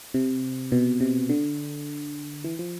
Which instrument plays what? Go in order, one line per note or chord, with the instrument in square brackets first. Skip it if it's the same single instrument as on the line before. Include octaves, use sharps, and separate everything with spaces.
[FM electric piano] C3
B2
C3
D3
E3
F3